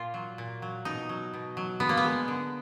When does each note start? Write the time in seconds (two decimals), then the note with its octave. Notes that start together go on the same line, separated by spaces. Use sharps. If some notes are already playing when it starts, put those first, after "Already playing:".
Already playing: A#2 F4
0.14 F#3
0.38 A#2
0.62 F#3
0.85 B2 D#4
1.09 F#3
1.34 B2
1.57 F#3
1.80 D3 B3
1.89 A#3
1.97 B3
2.04 G#3
2.28 D3